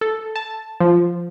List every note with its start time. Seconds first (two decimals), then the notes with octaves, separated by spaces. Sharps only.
0.01 A4
0.36 A5
0.80 F3